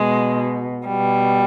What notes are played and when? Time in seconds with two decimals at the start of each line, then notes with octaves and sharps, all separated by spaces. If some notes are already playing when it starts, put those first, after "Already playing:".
Already playing: B2 G#3
0.87 B2 G3